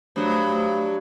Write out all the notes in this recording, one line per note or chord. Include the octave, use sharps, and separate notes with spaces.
G2 F#3 A3 C5 D#6